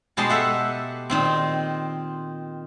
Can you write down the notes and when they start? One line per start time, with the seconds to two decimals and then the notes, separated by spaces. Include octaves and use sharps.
0.17 B2 G#3 G4 A5 C6
0.29 G4 A4 E5 F#5
1.10 A#2 D#3 C4